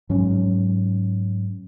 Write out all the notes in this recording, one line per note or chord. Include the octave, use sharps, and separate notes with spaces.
G#2 F#3 C#4